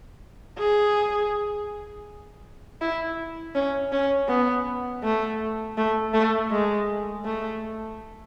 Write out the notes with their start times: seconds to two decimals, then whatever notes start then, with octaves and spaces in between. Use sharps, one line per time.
0.58 G#4
2.81 E4
3.55 C#4
3.92 C#4
4.28 B3
5.03 A3
5.77 A3
6.14 A3
6.51 G#3
7.25 A3